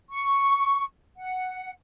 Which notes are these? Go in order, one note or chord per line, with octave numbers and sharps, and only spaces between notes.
C#6
F#5